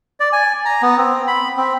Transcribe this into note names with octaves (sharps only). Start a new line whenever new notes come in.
D5
G#5
A#5
B3
C4
B5
C4